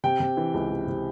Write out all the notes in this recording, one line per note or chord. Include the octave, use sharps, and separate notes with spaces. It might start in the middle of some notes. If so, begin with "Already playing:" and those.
C3 G5
C3
E3
C#2
C3
C3